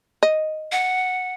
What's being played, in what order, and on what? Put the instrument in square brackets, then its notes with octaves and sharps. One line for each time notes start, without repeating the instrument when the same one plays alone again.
[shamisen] D#5
[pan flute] F#5